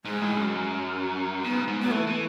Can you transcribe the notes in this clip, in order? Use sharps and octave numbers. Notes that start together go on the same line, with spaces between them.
G#2 G#3
A2
F#2
G#2 B3
G#2
F#3 B3
E3 A3
E3